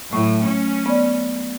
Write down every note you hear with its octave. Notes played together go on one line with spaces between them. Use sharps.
A2 F#3 A3 C#6
C#4
B3 D5